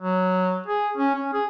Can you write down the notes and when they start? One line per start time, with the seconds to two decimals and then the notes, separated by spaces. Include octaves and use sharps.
0.02 F#3
0.67 G#4
0.97 C#4
1.15 C#4
1.33 G#4